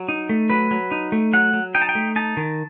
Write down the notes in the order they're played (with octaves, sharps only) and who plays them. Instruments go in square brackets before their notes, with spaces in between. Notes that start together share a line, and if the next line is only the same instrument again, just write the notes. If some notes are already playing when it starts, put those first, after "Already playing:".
Already playing: [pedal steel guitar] F#3
D#4
A3
F#3 B4
F#3
D#4
A3
F#3 F#5
F#3
D#4 G5
A5
G5
A3
D#4 A5
D#3